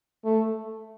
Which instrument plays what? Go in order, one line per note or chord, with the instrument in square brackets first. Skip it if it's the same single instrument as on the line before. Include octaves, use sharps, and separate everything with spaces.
[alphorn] A3